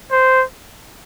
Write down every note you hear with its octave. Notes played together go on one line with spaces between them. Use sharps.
C5